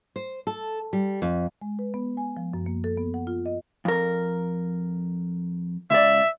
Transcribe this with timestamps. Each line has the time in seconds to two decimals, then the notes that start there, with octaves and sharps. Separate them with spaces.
0.16 C5
0.47 A4
0.93 G3
1.22 F2
1.62 G#3
1.79 B4
1.94 B3
2.17 G#5
2.37 F3
2.54 F#2
2.66 A#3
2.84 A4
2.97 B3
3.14 F#5
3.27 F4
3.46 D#5
3.85 F2 A#4
5.91 C#2 D5 E5